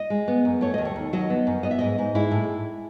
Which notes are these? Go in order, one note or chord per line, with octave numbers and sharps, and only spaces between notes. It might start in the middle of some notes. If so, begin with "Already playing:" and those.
Already playing: D#5
G#3
B3
F#2
A3 C#5
D#2 D#5
C#5
D#2
F#3 D#5
B3
F#2
B3 D#5
E5
G#2 D#5
G#2
G#3 E4
A2